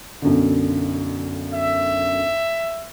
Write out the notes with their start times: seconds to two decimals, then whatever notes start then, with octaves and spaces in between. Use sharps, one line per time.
0.22 B1 F#2 D3
1.53 E5